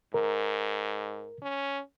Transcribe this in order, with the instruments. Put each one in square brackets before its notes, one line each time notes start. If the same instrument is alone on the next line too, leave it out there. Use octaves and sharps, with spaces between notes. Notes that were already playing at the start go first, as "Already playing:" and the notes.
[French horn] G#2 [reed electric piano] A#4
[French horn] C#4